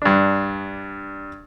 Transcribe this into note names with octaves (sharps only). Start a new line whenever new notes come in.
G2 D4